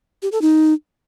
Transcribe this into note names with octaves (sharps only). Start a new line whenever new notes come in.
G4
A4
D#4